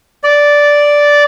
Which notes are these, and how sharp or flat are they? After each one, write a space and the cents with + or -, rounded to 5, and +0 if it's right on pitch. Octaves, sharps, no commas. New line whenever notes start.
D5 -5